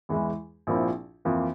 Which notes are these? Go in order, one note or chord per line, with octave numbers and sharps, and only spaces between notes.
E2 E3 G#3 E4
A#1 A#2 F3 C4 E4
F2 E3 A#3 F4